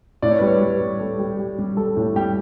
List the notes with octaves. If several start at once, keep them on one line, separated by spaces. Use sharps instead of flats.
A2 D5
C#5
G3 B4
C#5
G3 B4
G3
G3 A4
G3 G4
G3 G4
G3
G3 A4
A2
G3 G4